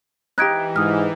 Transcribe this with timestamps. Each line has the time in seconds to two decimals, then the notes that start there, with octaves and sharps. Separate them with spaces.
0.38 E3 D#4 G4 F#6 G#6 D7
0.76 G#2 D#6 F6